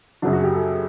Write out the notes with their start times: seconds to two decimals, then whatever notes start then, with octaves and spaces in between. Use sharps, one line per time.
0.22 F#2 C#3 F#3 D4
0.33 F#4
0.43 G4
0.54 A4